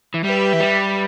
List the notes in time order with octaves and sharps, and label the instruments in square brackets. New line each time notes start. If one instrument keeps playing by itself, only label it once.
[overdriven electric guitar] E3
[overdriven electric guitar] G3 [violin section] G4 B4 E5
[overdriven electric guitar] E3
G3